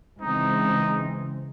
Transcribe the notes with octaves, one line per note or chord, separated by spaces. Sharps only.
C#3 E3 G#3 C4 D#4